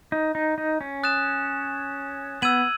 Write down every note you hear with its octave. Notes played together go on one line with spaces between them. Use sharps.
D#4
D#4
D#4
C#4
D#6 F#6 A6 E7
B3 E6 G#6 D#7 F#7